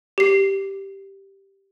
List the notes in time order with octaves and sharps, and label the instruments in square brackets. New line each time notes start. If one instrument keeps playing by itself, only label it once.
[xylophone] G4 C7